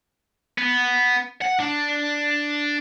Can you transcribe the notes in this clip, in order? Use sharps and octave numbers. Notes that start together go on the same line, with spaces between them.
B3
F#5
D4